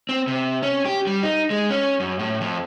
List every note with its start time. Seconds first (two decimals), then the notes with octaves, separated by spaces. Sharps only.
0.09 C4
0.28 C3
0.63 C#4
0.86 G4
1.07 G3
1.23 D#4
1.50 G#3
1.70 C#4
2.00 F#2
2.19 A2
2.41 F2